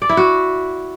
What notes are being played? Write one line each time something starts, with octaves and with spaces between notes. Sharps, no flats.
D5
E4
F#4